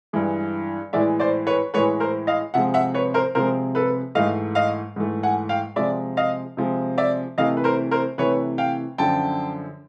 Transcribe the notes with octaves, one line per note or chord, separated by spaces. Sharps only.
G2 E3 G#3
A2 E3 G#3 D5 E5
C5 D5
B4 C#5
A2 E3 G#3 B4 C#5
A#4 C5
D#5 F5
C3 F3 G#3 E5 F#5
E5 F#5
B4 C#5
A#4 C5
C3 F3 G#3 A#4 C5
A4 B4
G#2 E3 A3 D#5 F5
D#5 F5
G#2 E3 A3
F#5 G#5
F5 G5
C3 F3 G#3 D5 E5
D#5 F5
C3 F3 G#3
D5 E5
C3 E3 A3 D#5 F5
B4
A#4 C5
A#4 C5
C3 E3 A3 B4 C#5
F5 G5
F#2 D3 F3 G5 A5